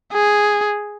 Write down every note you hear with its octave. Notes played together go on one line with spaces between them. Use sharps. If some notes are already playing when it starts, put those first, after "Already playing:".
G#4